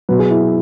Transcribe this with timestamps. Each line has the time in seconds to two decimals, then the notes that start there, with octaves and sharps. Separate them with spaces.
0.09 B2 F#3 B4
0.19 G#4
0.30 E4